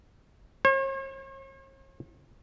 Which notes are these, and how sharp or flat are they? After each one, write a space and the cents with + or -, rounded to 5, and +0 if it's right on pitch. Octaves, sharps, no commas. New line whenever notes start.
C#5 -45